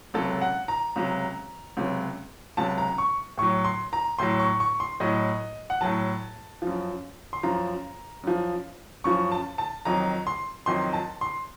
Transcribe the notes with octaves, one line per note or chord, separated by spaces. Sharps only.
C#2 C3 F#3 A4
F#5
A#5
C#2 C3 F#3
C#2 C3 F#3
C#2 C3 F#3 A5
A#5
C#6
A2 F#3 C#6
C6
A#5
A2 F#3 C6
C#6
C#6
C6
A2 F#3 D#5
F#5
A2 F#3 A5
F#2 F3
C6
F#2 F3 A#5
F#2 F3
F#2 F3 C#6
A5
A5
F2 D#3 F#3 A#5
C6
F2 D#3 F#3 C6
A5
C6